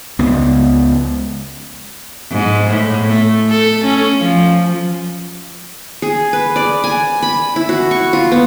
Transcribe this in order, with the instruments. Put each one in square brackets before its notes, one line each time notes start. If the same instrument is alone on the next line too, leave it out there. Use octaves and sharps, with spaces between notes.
[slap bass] C#2 B3
[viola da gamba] G#2
A2
A3
A4
C#4
F3
[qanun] G#4
B4
D5
G#5
B5
E4
F#4
C#6
F4
B3